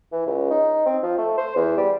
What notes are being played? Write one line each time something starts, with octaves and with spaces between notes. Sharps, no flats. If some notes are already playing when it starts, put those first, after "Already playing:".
E3
C#2
D#4
C4
F3
A3
C5
E2
G3